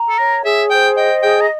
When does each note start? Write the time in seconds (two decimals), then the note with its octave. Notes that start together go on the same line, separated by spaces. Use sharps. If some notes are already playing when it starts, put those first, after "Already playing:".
Already playing: A#5
0.09 A4
0.18 A#4 C#5
0.44 G#4 E5
0.70 C5 G5
0.97 D#5 G5
1.23 G#4 G5
1.41 A#5